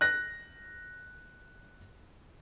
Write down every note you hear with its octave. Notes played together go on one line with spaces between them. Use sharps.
F#6 A#6